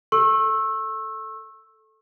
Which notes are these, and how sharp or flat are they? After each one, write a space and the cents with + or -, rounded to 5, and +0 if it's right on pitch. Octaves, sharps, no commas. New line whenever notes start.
A4 +0 C#6 -35 E6 +0